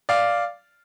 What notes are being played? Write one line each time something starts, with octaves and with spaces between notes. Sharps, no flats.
D5 F5